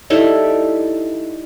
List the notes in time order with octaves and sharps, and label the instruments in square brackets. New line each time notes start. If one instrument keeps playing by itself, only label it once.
[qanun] G3 D#4 E4 A4